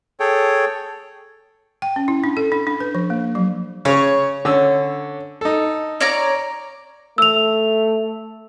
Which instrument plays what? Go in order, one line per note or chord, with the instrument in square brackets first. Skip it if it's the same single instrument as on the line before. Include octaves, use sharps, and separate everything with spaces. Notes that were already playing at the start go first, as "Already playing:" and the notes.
[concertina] G#4 A4 C#5 G5
[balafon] G5
C#4
E4
D4
A4
D4
D4
B4
F3
A#3
F#3
[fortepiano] C#3 [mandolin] C#5
[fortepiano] D3 C#4 E6
D#4 A4
[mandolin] C#5 D5 A#5
[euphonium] A3 [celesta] E6 F7